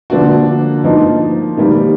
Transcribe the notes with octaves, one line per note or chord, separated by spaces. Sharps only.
D3 F3 A#3 D4 F#4
F3 A#3 D#4
D#3 G3 A#3